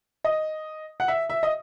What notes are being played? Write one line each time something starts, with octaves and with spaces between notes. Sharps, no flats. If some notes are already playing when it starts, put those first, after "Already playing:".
D#5
F#5
E5
E5
D#5